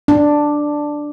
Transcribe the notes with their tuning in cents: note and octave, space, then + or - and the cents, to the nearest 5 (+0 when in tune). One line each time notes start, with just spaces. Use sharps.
D4 +5